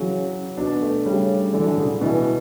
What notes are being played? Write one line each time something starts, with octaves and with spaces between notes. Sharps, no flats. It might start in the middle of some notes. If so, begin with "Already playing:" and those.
Already playing: C#3 E3 F#3
B2 D4
A3
C#3 G3
D3 E3
F#3
E3
C#3
B2 E3